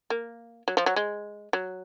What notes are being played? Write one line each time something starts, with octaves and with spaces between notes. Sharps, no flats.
A#3
F#3
F3
F#3
G#3
F#3